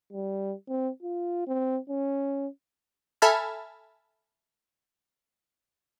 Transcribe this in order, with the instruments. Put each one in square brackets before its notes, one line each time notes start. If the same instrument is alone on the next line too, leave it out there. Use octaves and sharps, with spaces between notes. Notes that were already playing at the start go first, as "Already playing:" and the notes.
[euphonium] G3
C4
F4
C4
C#4
[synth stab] A4 E5 G#5 A5 B5 F6